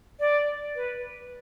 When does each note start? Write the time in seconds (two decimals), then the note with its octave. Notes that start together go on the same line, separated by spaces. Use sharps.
0.20 D5
0.76 B4